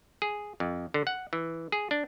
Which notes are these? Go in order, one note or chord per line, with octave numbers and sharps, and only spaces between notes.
G#4
F2
D3
F#5
E3
G#4
D4